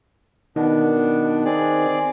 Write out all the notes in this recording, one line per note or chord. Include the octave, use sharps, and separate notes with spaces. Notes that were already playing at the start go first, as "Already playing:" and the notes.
B2 D#3 B3 D4
C4 G#4 D5